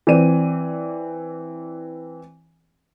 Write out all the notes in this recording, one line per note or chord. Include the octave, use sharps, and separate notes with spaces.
E3 C4 D5 D#7